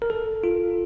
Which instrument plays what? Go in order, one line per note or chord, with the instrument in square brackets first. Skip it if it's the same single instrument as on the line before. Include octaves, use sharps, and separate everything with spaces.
[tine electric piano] A#4
A4
F4